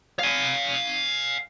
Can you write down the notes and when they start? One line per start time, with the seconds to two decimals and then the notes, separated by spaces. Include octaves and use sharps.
0.19 F5 G#5